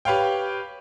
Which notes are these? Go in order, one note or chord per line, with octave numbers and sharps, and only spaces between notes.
G4 B4 C#5 F5 G5